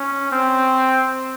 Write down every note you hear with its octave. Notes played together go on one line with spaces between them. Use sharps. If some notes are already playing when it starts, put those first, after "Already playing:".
Already playing: C#4
C4